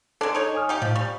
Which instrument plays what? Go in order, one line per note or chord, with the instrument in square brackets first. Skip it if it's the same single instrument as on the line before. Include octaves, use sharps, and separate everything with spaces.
[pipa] G#3 D4 [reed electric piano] A4
[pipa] D#4 C#5
[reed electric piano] G#5 D#6 F6
[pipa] D#4 G4
[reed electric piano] A2 [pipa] F3
[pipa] G3 [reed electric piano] C#6